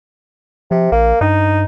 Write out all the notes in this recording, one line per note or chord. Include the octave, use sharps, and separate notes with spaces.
C3 F3
A#1 A#3
G2 D#4